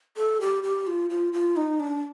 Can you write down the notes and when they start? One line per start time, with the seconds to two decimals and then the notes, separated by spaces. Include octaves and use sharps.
0.17 A4
0.41 G4
0.63 G4
0.87 F4
1.10 F4
1.33 F4
1.56 D#4
1.80 D4